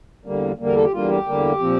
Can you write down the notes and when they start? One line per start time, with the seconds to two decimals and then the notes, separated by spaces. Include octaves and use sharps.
0.25 E2 D3 G3 A#3
0.59 E2 D3 G3 A#3
0.66 A#4
0.76 A4
0.83 G4
0.92 E2 D3 G3 A#3 F4
1.09 G4
1.26 E2 D3 G3 A#3
1.59 A#2 F3 C4